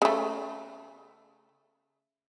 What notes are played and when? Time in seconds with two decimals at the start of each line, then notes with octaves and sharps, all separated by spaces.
0.02 C#3 A3